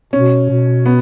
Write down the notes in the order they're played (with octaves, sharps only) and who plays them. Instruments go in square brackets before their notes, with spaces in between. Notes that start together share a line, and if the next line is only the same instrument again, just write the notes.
[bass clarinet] B2 [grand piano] C#4
[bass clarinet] B2
[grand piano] B3